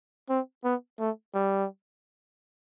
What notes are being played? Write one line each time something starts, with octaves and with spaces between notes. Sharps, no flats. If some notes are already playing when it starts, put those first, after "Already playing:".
C4
B3
A3
G3